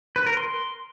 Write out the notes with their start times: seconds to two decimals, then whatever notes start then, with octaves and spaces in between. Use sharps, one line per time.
0.16 B4
0.26 A#4
0.37 C6